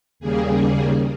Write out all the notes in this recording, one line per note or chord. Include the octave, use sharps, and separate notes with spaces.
D#2 C#3 G3 A#3 G#4